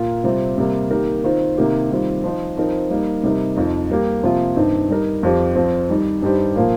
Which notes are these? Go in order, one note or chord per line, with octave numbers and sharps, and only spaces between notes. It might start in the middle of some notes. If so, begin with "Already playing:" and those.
Already playing: A#2 A#3 F4
C3 G3 C4 F4
C3 G3 A#3
D#3 A#3 G4 A#4
D#3 C4 F4 C5
C3 D#3 A#3 G4
D#3 G3 C4 F4
F3 D#4 C5
F3 C4 D#4 A#4
G3 A#3 D#4
C3 G3 D#4 A#4
F2 F3 D#4
G3 A#3 G4
C3 F3 A#3 F4
G2 D#3 C4 D#4
G3 D#4 A#4
F2 F3 C4 G4
F2 F3 C4
D#3 G3 D#4
G2 G3 D#4 G4 C5
A#2 F3 A#3